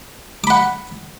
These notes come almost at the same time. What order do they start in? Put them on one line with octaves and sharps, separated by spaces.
D6 B5 F#5